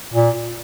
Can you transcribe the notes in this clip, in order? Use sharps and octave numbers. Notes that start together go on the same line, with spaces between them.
A#2